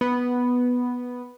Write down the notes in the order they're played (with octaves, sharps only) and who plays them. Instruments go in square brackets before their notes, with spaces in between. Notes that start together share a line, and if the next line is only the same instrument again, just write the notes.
[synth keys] B3